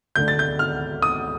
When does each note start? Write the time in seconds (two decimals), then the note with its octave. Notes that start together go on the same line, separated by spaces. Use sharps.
0.16 D2 D3 A3 D4 G6
0.28 A6
0.39 G6
0.59 F6
1.02 D#6